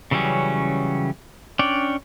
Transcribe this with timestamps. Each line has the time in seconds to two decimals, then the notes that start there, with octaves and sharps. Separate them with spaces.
0.11 C#3 E3 F#3 G3 C#4
1.59 C#4 D4 D5 G5